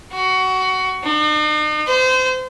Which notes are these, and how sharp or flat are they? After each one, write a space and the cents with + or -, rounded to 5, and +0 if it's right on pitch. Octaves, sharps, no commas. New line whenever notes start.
F#4 +20
D#4 -45
C5 -30